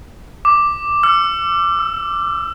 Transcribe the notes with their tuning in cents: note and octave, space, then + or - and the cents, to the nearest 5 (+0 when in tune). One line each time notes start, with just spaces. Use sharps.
D6 +0
E6 +45
E6 -5